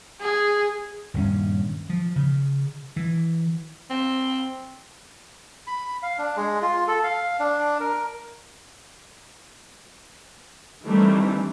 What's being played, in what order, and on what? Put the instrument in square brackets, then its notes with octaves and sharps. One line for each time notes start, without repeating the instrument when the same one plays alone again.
[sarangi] G#4
[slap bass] D#1 G2 C#4
F3
C#3
E3
[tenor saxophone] C4
[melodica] B5
F5
D4
G#3
F4
A4
F5
D4
A#4
[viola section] D#3 E3 G3 A3 C4 D4